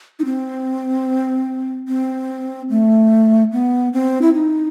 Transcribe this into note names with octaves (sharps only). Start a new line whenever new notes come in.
D#4
C4
C4
A3
B3
C4
E4
D#4